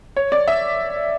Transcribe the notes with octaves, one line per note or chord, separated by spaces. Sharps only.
C#5
D5
E5